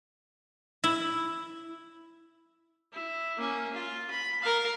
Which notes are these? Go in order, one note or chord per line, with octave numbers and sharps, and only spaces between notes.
E4
E4
A#3 C#4
F4
B5
A#4 F5